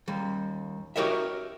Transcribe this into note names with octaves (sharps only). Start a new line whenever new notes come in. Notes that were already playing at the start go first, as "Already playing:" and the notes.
D#2 G3
F#4 G4 A#4 C#5 D#5 E5